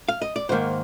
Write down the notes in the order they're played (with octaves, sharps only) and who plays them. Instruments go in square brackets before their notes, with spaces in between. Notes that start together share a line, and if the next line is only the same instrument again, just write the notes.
[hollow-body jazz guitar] F5
D#5
D5
G#2 D#3 A#3 C5